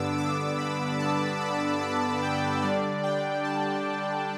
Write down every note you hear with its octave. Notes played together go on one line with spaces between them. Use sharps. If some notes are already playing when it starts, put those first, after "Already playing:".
Already playing: G2 D3 B3 D4 D6 E6
D6
B5
A5
B5
A5
G5
D3 G3 D4 D5
G5
A5